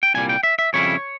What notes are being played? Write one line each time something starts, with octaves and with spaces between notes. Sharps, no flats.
G5
C2 A#2 G3 G#5
G5
E5
E5
F2 C#3 G3 C#4 E4 C#5